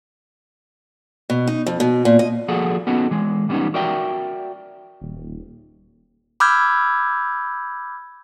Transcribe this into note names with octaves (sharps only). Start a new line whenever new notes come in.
B2
D#4
F2
B2
A#2
D#5
F3 A#3 F#4 G#4 A4
B3 C#4 D#4 F#4 A4
E3 G#3
E3 G3 A3 B3 C#4 D#4
F#4 A#4 D5 E5 G5
D#1
B5 D6 E6 F6 G6 G#6